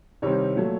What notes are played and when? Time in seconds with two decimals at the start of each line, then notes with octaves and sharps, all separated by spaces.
0.22 C2 C3 D#3 G3 C4 C#5
0.56 A#2 F#3 A3